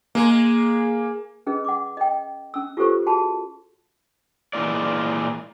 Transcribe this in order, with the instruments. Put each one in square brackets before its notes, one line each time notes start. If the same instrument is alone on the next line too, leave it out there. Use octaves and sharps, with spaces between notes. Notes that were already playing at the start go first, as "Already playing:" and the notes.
[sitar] G#3 [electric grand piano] A#3
[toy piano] C#4 G#4 B4 D#5
F#5 D6
D#5 G5
C#4 E6
F4 G4 A4 B4 C5 C#6
F#4 G#4 A5 B5
[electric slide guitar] A#2 E3 G3 G#3 F4 D5